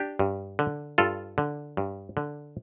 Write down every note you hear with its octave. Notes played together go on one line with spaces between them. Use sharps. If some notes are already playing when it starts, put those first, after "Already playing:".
Already playing: D4 G4
G2
D3
G2 F4 A4
D3
G2
D3